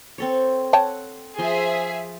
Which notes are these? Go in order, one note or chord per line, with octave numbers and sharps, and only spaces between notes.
C4 A4 C#5
C#5 F#5 G5 A5
F3 G#4 E5 C6